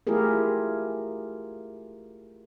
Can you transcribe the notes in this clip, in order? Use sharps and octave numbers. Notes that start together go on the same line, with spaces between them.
A3 E4 F4 G4 G#4 A#4